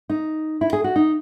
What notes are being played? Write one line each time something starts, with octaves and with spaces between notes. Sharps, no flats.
D#4
E4
G#4
F#4
D#4